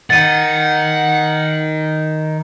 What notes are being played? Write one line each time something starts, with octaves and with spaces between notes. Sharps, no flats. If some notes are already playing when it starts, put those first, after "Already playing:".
D#3 F#5 A6 D#7